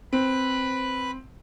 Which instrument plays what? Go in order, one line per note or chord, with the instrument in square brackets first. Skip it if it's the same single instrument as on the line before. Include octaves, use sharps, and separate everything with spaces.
[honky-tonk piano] C4 [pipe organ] B4 B5 F#6